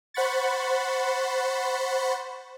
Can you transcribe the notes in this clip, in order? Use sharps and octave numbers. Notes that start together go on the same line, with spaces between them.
C5 F#5 B5 C#6 A6